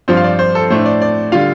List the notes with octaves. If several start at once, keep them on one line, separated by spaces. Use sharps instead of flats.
G2 F3 C4 F4 C5
F5
D5
C5
A4
A2 A3 D4 C5
D5
D5
D3 G3 F4 F5